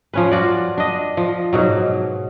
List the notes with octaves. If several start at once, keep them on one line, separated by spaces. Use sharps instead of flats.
F3 C#4 B4
F4 F#4 D5
D4 D#5
F3
G#2 B2 F#3